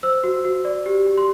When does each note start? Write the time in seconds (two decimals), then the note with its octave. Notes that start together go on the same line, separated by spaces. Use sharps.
0.03 C5 E6
0.24 F#4
0.45 F#4
0.65 D5
0.86 G4
1.06 G4
1.17 C6